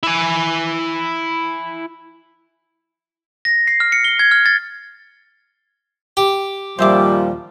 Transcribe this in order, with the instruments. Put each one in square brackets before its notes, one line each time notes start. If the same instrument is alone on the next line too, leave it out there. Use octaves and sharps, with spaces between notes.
[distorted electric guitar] E4 G#5
[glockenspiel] A#6
C7
F6
C#7
G7
G#6
F6
A6
[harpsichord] G4
[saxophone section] D#2 A#2 F3 [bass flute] G3 [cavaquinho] C5 E5 D6